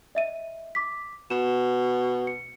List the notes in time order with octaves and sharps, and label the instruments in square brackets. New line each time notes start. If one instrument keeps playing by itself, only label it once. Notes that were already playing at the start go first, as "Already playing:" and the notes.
[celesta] D#5 E5 D#7
D6 B6
[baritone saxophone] B2 [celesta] E7
[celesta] C#7